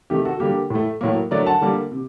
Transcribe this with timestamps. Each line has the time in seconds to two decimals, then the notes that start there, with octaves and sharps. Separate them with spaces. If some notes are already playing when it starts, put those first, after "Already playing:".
0.10 C3 D#3 A3 G4
0.25 F#4 A4
0.40 D3 G3 A#3 G4
0.70 A2 A3
1.01 A2 F#3 A#3
1.31 D3 F#3 A3 A#4 D5
1.46 F#5 A5
1.61 D3 G3 A#3
1.92 C3